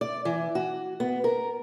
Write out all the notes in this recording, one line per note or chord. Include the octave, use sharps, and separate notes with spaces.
D5
E3
F#4
B3
A#4